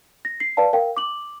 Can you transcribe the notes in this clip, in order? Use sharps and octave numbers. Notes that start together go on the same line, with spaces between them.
A#6
C7
B4 D5 F5 A5
A#4 F5 G5
D6 F#7